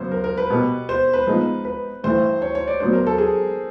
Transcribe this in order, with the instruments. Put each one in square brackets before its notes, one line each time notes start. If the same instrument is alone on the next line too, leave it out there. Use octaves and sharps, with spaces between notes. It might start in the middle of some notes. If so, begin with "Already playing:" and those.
Already playing: [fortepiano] F#2 C#3 F#3 B3 [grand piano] C5
[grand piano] A#4
A#4
B4
[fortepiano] B2 G3 B3
[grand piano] C5
B4
[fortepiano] F3 G#3 B3 D#4
[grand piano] B4
[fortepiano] G2 E3 A3 [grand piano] C5
[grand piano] C#5
C#5
D5
[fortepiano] F#3 B3 D4 [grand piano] C5
[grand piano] A#4
A4
G#4